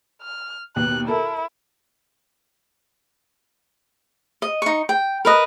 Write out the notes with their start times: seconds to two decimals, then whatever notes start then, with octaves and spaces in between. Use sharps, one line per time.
0.22 F6
0.76 D#2 B2 F#6
1.08 E4 A4 A#4
4.42 D#5
4.62 D#4 C#6
4.89 G5
5.25 A#4 B4 D#5